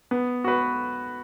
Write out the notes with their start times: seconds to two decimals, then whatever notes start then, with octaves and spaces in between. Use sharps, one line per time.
0.11 B3
0.44 F#4 B4